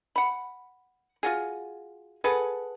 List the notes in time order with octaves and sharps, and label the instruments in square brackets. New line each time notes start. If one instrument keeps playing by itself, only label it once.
[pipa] F#5 B5
F4 F#4 G#4
G#4 A4 B4 F#5